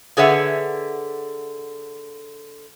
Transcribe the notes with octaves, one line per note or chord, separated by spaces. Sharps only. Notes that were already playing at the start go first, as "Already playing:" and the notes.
D3 G#4 B4 C#5 E5 F#5